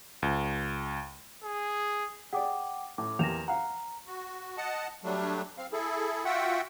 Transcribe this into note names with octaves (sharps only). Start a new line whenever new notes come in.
C#2
G#4
G#4 D5 F#5 G5 D6
A2 D6
E2 A#3 G4 A#6 E7 F7
F5 F#5 A#5
F#4
D#5 F#5 A5
F#3 G3 A3 D4
C4 F5
E4 G#4 A4
F4 F#4 E5 F#5 G5